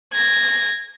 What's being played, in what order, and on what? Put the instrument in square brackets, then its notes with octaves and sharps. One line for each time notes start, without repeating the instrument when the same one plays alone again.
[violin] G#6 A#6